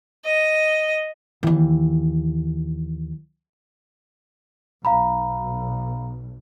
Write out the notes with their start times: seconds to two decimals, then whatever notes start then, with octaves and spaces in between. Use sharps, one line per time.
0.25 D#5
1.43 D#2 E3
4.85 B1 F5 A#5 B5